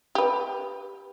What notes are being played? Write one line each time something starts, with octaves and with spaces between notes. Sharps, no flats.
G4 B4